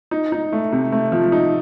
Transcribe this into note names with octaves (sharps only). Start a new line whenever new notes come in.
D#4
D#4
A3
C3
A3
F3
D#4